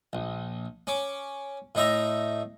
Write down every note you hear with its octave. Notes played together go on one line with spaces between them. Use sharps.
A#1
C#4 D6
A2 D#4 E5 A#5